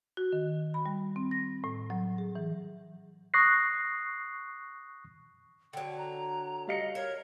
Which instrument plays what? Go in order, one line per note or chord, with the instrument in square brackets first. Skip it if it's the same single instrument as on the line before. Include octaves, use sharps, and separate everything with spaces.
[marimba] F#4
D#3
B5
G3
C4
A#6
A2
F#3
G#4
E3
[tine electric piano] C#6 D#6 F#6 A#6 C7
[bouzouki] D3 F#3 [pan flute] G5
[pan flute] A#5
[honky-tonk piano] G3 F5 C#7 [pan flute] D#5
[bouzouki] A#4 [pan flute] C#5